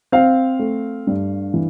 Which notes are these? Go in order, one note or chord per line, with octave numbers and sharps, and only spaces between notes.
C4 F5
A3
G2
E3